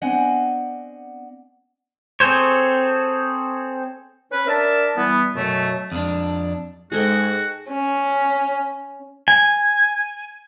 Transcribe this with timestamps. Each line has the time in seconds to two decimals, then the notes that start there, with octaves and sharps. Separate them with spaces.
0.02 B3 C4 D4 D#5 F#5 G#5
2.20 C4 G#4 A4 C5 C#5
4.31 C#4 B4
4.47 D4 A#4 E5 A5
4.97 E3 G3 B3
5.36 F#2 B2 F#3 A3
5.92 F2 D4
6.92 G#2 G#3 F#4 G#4 A4 G5
7.71 C#4
9.28 G#5